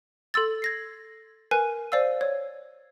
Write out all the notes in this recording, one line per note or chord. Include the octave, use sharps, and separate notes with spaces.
A4 C6 E6 A6
G#6 A#6 C7
A#4 B4 G#5 F#6
C5 D5 F5 E6
C#5